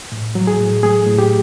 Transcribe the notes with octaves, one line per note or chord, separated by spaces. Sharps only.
A2
F#3
G#4
A2
A3 G#4
A2
G4